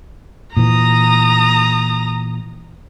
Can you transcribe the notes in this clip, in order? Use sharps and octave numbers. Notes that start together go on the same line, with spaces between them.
A#2 E3 A#5 D#6